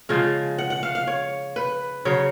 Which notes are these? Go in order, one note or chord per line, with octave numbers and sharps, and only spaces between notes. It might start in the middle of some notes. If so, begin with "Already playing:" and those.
C#3 F3 G#3 F5
F#5
F#5
F5
F5
C#5
B4
C#3 F#3 C#5